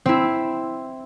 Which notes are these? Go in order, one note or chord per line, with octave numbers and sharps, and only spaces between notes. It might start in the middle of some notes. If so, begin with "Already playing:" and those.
C4 E4